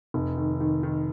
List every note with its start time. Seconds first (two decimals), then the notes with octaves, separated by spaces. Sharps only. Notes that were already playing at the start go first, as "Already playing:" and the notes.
0.14 F1
0.37 D#3
0.60 D#3
0.83 D#3